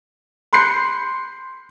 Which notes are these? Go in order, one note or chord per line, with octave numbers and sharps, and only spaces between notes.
B5 C6 F#6 G6 C7 C#7